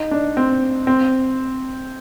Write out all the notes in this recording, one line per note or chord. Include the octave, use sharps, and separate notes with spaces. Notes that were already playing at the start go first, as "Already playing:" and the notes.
Already playing: D#4
D4
C4
C4